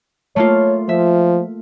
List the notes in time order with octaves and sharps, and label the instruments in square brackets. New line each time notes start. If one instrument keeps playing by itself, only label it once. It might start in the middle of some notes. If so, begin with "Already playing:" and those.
[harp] A3 A#3 F4 [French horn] C#5
[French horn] F3 [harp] E5